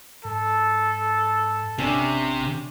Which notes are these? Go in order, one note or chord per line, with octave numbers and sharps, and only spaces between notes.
G#2 A4
A1 C3 C#4 D4